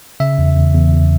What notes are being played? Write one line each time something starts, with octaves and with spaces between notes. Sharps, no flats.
C#3 E5
E2
E2
E2
E2